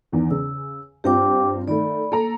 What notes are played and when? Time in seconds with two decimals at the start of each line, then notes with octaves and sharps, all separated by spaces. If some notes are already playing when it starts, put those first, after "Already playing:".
0.12 E2 D#3
0.31 C#3 E6
1.04 G2 C4 F4 G4 G5 D6
1.68 D#3 A3 D5 B5
2.12 A#3 A4 A#5